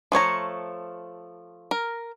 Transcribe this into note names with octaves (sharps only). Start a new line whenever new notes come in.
F3 A3 C#5 A#5
A#4